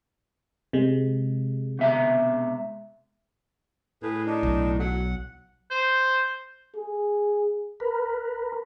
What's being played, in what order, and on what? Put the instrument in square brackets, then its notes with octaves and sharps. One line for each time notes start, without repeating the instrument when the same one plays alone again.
[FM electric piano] C3 G#3
[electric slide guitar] B2 E5 A#5
[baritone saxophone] A2 [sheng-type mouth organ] G#4 B4
[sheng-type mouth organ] D4 D#4
[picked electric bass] B1
[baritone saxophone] F#3 [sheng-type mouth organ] F#5
[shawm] C5
[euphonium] G#4
[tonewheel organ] A#4 B4